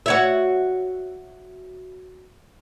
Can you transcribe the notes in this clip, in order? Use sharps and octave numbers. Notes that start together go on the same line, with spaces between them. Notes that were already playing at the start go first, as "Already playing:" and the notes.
F#4 C#5 E5